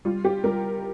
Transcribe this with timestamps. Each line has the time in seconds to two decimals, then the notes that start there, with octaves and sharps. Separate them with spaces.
0.05 G3 F4
0.25 G4
0.44 G3 A#4